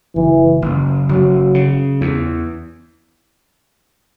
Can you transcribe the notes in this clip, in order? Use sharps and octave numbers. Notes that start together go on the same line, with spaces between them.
F#1 E3
F#1
F#1 F#3
C#3
E2